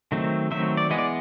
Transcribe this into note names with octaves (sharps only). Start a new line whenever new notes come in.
D#3 F#3 A3 C4
D#3 F#3 A3 C4 E5
D5
E3 G#3 B3 D#5
D5